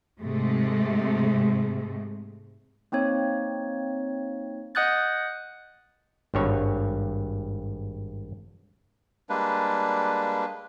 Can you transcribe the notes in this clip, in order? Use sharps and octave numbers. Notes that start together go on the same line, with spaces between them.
G#2 C3 G#3 A3
A#3 C4 D#4 C#5
D#5 F#5 D#6 F#6 G6 A6
G#1 G2 C#5
G3 G#3 A#3 D4 B4